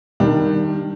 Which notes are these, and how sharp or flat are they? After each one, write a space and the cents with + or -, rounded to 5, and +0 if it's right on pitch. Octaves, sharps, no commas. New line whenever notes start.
D#3 +0 G3 +0 D4 +20